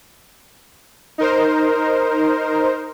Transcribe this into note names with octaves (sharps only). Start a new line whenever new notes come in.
D#4 A#4 C5